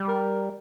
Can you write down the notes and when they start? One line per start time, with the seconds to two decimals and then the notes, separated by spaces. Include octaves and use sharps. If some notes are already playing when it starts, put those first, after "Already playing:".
Already playing: G3
0.08 A#4